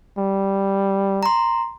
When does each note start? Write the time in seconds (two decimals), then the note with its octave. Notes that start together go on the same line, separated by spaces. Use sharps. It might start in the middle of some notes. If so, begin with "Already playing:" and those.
0.18 G3
1.23 A#5 C6